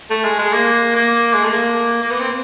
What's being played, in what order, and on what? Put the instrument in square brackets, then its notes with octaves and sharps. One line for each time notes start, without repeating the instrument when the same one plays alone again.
[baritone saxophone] A3
G#3
G#3
A#3
A#3
G#3
A3
A#3
A#3
B3
C4